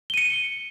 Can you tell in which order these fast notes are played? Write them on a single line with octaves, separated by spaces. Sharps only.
G7 D#7 C#7